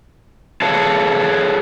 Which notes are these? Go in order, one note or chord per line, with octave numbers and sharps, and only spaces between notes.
G#4 A4 B4 C#5 F5 A5